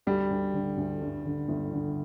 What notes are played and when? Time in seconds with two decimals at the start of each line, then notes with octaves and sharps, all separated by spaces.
0.07 D2 G3
0.30 D2
0.54 D3
0.77 D2
1.01 G2
1.25 D3
1.48 G1
1.72 D3